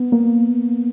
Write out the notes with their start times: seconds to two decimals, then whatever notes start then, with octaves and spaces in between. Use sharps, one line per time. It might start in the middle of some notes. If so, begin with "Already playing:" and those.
Already playing: B3
0.12 A#3